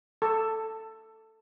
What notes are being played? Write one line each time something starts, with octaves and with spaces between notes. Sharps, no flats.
A4